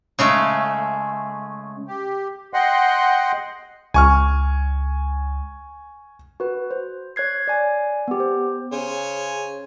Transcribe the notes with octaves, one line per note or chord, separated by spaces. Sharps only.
C#3 G#3 A3
G4
D#5 F#5 G5 C6
C#2 G#5 C#6 F6
F#4 B4
C5
C#5 F#6 G#6 C7
D5 G#5
B3 G4
C5
C#3 C5 C#5 G#5